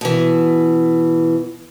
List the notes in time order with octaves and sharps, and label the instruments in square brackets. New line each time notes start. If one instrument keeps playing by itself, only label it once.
[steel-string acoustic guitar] B2 E3